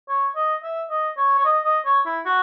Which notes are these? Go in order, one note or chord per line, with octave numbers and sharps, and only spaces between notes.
C#5
D#5
E5
D#5
C#5
C#5
D#5
D#5
C#5
E4
F#4